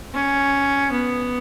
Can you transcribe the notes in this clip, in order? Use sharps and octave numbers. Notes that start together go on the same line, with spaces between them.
C#4
B3